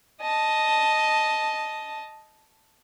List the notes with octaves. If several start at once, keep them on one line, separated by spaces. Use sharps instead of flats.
D#5 A5